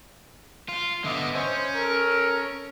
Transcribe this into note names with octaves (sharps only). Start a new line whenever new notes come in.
F4
D3 B3 D#5 E5 D6
C#4 C5
A4 A#4